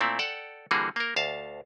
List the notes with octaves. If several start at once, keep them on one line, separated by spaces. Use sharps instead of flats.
A#2 A3 C4 E4
A4 D5 F#5 G5
D3 E3 G3 A#3 F#4 G#4
A#3 A#4
D2 F5 A5